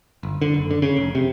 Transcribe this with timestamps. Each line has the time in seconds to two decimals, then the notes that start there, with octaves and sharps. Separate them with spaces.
0.23 G1
0.42 D3
0.54 F#1
0.71 D3
0.82 C#3
0.97 F1
1.15 C3